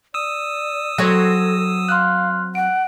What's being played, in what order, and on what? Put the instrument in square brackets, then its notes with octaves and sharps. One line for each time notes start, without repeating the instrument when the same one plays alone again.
[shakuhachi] D5 [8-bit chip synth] D#6 E6
[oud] F#3 C4 C#5 [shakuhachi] A4 [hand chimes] A#6
[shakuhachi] F5 [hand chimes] C6 F6 F#6
[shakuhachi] F#5 [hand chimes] D7